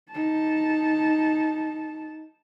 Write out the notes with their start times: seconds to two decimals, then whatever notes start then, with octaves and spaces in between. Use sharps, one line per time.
0.11 D#4 A5